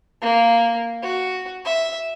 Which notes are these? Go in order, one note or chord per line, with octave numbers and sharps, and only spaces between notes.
A#3
F#4
E5